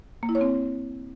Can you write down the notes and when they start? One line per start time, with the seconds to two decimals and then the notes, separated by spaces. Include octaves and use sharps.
0.23 A#3
0.29 E4
0.35 C#5
0.41 C4